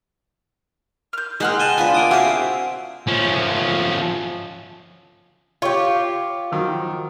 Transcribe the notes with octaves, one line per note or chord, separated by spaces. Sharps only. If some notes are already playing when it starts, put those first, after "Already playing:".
F6 G6
G#3 C4 D#4 F#5 C6 F6
D#5 G#5 A5
B3 D4 F4 B4 G#5
A#3 D6 D#6
C4 E4 F#4 G#4 E5 F5
F3 C#4
F4 G4 C#5 C#6
D#3 F3 F#3